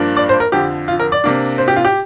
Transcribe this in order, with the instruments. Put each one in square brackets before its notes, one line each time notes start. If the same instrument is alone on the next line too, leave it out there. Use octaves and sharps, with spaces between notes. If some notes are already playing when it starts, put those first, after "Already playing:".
Already playing: [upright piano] G2 F3 A#3 D4
D5
C5
A#4
F2 D3 F3 G4
F4
A#4
D5
C3 A#3 D4
C5
G4
F4
G4